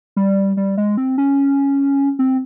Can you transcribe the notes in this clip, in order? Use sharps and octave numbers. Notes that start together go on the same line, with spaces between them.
G3
G3
G#3
C4
C#4
C4